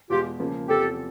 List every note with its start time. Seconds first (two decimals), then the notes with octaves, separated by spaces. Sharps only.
0.10 E2 B2 G#3 F4 G4
0.40 C#3 F3 A#3
0.68 E2 C3 F3 G4 A4